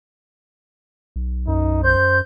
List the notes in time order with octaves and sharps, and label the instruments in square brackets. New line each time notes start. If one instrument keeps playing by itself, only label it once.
[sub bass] B1
[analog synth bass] F#2 [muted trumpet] D#4
[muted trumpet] C5 [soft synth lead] G6